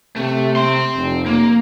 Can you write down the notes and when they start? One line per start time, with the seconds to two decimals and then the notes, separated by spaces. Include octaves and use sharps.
0.16 C3 A3
0.56 C4 C6
0.96 F1
1.26 A#3